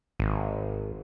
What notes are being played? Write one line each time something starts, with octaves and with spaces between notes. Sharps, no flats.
G#1